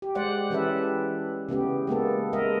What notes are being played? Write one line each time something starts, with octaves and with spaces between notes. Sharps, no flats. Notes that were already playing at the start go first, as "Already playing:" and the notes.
G4
G#3 C5 D5 F#5
E3 C#4 G4 A4 B4 E5
C#3 A3 B3 G4
G#3 A#3 B3 A4
G#3 B3 A#4 D#5 E5